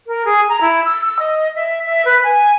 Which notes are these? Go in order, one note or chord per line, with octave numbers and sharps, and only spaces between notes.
A#4
G#4
A#5
E4
E6
E6
D#5
E5
E5
B4
G#5